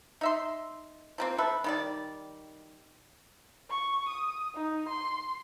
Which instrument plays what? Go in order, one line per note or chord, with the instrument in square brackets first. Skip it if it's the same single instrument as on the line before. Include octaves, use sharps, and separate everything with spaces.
[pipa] D#4 E5 C6
F3 A#3 C4
A4 B4 E5
D#3 G3 D5
[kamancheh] C#6
D#6
D#4
C6